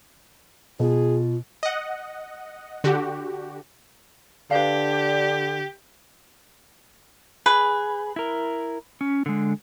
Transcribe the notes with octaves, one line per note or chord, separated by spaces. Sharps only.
B2 F4 G#4
D#5 F#5
D3 F#4 G4
D3 D4 G4 B4 F5
G#4 B4
E4 A#4
C#4
D3 G#3